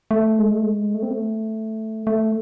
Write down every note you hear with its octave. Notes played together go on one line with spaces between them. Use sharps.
A3
G#3
A3
G#3
A3
C4
A3
A3